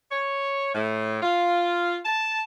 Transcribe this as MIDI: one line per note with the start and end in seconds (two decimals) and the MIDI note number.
0.11 0.72 73
0.75 1.18 45
1.22 1.98 65
2.05 2.42 81